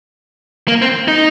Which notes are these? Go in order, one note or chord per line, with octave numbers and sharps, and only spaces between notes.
A#3
C4
D#4